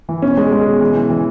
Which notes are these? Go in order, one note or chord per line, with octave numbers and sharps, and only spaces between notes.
E3
B2 C#4
G#3
G#3
B2
E3
E3
E3